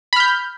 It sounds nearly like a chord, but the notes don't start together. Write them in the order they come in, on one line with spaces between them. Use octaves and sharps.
B5 F6 G6